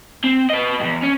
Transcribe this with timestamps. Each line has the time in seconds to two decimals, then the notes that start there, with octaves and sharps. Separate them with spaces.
0.24 C4
0.50 B4 D#5
0.81 E2 G2
1.03 C#4